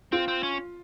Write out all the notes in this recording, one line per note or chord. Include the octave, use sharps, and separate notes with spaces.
C4 F4
C4
C#4